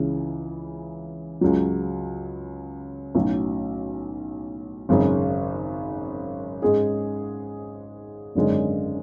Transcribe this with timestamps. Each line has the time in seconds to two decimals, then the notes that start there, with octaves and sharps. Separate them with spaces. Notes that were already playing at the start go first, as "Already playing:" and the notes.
Already playing: C#2 C#3 E3
1.41 C#2 C#3 F#3
3.15 B1 A2 F#3 C#4
4.89 G#1 F#2 C#3
6.62 G#2 G#3 C#4 G#4
8.35 G#1 F#2 D3 G#3 C#4